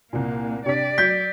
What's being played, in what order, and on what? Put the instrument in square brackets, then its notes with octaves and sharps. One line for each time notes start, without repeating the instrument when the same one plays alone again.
[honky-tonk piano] C2 A#2 [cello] A#3
[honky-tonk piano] C3 D4 B6 [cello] D5
[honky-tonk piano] F#3 [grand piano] G6 [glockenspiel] B6